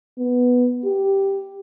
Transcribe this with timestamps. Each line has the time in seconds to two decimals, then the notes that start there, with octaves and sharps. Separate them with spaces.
0.19 B3
0.85 G4